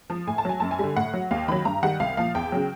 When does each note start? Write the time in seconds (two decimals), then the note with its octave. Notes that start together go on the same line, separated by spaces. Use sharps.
0.10 F3
0.27 A2 G#5
0.38 A5
0.45 F#3 G#5
0.60 F#2 A5
0.71 G#5
0.79 D3 G3
0.96 A2 F#5
1.13 F#3
1.31 D#2 F5
1.48 D#3 F#3 B5
1.65 G2 A#5
1.83 D#3 G3 F#5
2.00 C2 F5
2.17 A#2 F3 F5
2.35 E2 G5
2.52 C#3 F#3